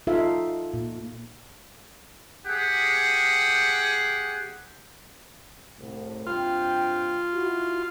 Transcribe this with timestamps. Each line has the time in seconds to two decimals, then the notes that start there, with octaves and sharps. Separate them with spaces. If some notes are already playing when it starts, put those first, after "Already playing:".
0.07 D#4 F4 A4 E5 F5
0.74 A#2
2.46 G4 G#4 F#5
5.78 C2 A2
6.27 G2 C3 F4 G5
7.34 E4 F#4